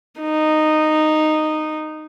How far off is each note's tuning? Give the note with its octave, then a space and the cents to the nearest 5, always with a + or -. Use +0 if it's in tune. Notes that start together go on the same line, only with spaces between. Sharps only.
D#4 -10